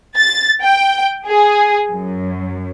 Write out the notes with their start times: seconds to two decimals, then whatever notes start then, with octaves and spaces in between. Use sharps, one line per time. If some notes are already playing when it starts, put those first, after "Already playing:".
0.17 A6
0.63 G5
1.27 G#4
1.89 F#2